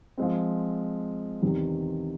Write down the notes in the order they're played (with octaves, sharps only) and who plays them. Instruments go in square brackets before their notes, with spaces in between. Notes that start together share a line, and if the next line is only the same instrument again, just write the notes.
[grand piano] F3 G#3 C4
E2 C3 D#3